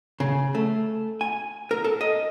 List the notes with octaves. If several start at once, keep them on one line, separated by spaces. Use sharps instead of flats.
C#3
A3
G#5
A#4
A4
D#5